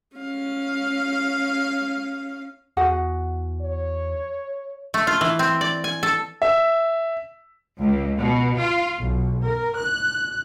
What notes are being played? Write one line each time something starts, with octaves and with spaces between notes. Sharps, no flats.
C#4 F5
E2 F#4 G#4 F#5
C#5
A3
F4
E3
C4
D5
G#5
A4
E5
C#2
B2
F4
B1
A#4
F#6